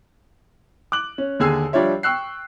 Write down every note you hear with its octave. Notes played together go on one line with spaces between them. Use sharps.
D6 F#6 F#7
C#4
D#2 D3 G#4 G#5 E6 C7
F3 G3 D4 F4 C#5 E5
G5 C#6 E6 F#6 C7